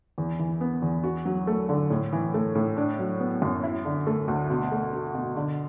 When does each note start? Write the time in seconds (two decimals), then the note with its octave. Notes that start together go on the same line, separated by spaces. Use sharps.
0.18 E2
0.39 E3
0.61 B3
0.82 E2
1.03 F#4
1.25 F#3
1.47 A3
1.69 D3
1.90 A2
2.13 E3
2.34 A3
2.55 A2
2.77 D4
2.99 F#3
3.20 B3
3.42 F#2
3.63 E4
3.85 D3
4.07 A3
4.28 D2
4.50 B2
4.72 A3
4.93 F#4
5.15 B2
5.36 D3